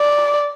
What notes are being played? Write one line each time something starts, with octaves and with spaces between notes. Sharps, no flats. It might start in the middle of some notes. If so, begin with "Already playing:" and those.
Already playing: D5